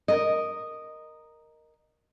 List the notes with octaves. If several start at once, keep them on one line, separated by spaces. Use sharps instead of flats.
A#4 D#5